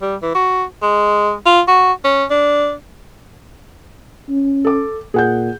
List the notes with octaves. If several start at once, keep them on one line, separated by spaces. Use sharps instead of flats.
G3
E3
F#4
G#3
F4
F#4
C#4
D4
C#4
A4 D6
A#2 G#4 F#5 G6